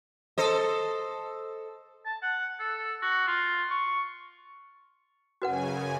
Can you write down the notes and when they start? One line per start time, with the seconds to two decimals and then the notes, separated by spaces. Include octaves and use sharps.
0.38 A4 C5 D#5
2.06 A5
2.22 F#5
2.60 A4
3.02 F#4
3.27 F4
3.71 C#6
5.42 F#2 C#3 F#4 B4 F#5 G#5